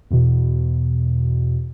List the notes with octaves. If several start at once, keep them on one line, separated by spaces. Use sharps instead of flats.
E2 B2